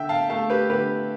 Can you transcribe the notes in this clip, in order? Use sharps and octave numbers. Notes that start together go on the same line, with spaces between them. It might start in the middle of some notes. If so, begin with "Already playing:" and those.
Already playing: D3 E5 G5
F5 A5
A3 F5 A5
G4 B4
D3 G4 B4